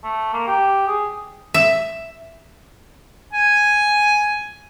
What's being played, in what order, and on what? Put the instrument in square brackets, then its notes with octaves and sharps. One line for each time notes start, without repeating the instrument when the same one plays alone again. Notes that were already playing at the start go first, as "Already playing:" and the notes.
[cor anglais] A3
A#3
G4
G#4
[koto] E5
[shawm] G#5